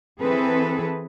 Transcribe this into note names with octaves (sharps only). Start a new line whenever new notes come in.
E3 C4 G#4 A4 B4